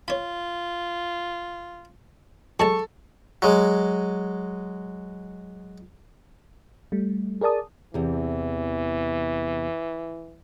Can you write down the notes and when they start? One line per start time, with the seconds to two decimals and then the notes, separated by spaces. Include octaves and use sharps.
0.08 F4 C#5 B5
2.60 F#3 G#3 A4 A5 C#6
3.42 F#3 G#3
6.92 G3 A3
7.41 G#4 A#4 D5 A5 D#6
7.94 E2 C3 E3